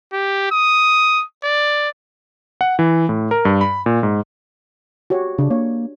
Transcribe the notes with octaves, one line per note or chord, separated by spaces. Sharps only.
G4
D#6
D5
F#5
E3
A2
A#4
G2
B5
A#2
G#2
F#4 G4 C#5
C#3 D4
A#3 C#5